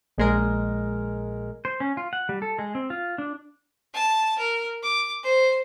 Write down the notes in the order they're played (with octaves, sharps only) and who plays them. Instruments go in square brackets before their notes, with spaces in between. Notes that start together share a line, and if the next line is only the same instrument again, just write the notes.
[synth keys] A#1 G#3 A#4
[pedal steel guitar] C5
C#4
F4
F#5
G3
A4
G#3
C4
F4
D4
[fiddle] A5
A#4
D6
C5